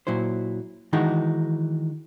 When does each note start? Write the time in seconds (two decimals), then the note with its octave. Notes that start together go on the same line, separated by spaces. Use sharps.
0.07 A#2 F#3 E4 C5
0.93 D#3 E3 G#3 D#4 F#4